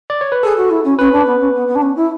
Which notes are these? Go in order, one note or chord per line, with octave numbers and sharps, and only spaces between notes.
D5
C#5
B4
G#4 A4
F#4
E4
C#4
C#4 B4
D4
B3
C#4
B3
B3
D4
C#4
E4